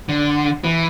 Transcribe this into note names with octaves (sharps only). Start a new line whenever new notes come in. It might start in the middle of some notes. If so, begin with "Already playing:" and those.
D3
E3